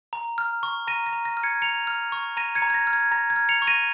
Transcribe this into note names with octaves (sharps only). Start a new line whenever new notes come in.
A#5
F6
C#6
A#5 A#6 D#7
A#6
A#5
A#6
F6
G#6 C#7
A#5 C#7 F7
F6
C#6
A#5 A#6 D#7
G#6 C#7
A#5
G#6
A#6
F6
G#6
A#5 A#6
G#6
F6
C#7 F7
C#6
A#6 D#7